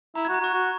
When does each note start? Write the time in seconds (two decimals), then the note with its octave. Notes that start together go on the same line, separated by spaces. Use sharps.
0.15 E4 A#5
0.25 G#6
0.29 F#4
0.34 A#5
0.41 F#4 C#6
0.54 F#4